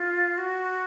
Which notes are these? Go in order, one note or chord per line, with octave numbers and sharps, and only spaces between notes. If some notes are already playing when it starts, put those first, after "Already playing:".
Already playing: F4
F#4